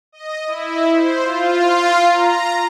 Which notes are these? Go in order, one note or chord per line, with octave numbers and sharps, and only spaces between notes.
D#5
E4
C5
F4
A#5